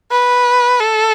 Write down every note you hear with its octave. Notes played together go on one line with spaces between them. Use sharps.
B4
A4